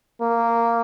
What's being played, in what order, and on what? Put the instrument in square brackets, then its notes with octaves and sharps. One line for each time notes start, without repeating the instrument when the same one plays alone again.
[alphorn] A#3